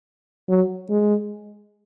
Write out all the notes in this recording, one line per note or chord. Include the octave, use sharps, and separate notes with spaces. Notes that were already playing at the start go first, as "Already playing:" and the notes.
F#3
G#3